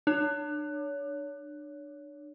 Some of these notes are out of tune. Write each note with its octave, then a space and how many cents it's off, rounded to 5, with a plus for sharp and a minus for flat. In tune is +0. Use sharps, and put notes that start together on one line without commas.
D4 +30 C#5 +30